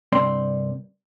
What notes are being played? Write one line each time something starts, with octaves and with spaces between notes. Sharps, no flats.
C2 G2 C4 D5 C6